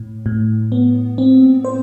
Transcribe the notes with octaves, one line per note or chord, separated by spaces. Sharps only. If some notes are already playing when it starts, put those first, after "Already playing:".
Already playing: A2
A2
B3
C4
C5